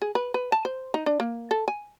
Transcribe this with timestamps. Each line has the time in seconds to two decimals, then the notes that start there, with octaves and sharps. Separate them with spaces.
0.02 G#4
0.15 B4
0.34 B4
0.52 A5
0.65 C5
0.94 D#4
1.06 D4
1.20 A#3
1.51 A4
1.68 G#5